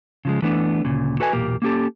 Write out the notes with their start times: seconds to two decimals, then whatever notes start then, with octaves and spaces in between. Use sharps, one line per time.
0.25 C#3 F3 G#3
0.42 E3 A3 B3 D4
0.85 D2 A#2 C#3
1.20 F#4 A4 B4 D#5 G#5
1.33 B1 E2 A#2 A#3 G4
1.62 A#3 C#4 G4 A4